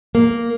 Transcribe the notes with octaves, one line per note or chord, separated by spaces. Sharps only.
A#3